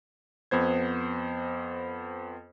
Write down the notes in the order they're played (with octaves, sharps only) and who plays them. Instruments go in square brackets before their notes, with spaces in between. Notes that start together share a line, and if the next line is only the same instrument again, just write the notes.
[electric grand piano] F2 B3 C5 G#6